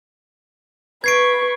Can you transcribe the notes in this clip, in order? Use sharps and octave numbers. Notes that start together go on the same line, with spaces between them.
B4 C#6 G#6 C7 D7